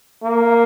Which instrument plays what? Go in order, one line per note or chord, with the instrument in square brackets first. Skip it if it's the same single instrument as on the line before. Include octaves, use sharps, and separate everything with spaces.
[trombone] A#3